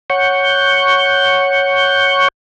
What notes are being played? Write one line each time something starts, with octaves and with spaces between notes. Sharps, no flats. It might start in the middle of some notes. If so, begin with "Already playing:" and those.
C#5 F#5 C#6 G6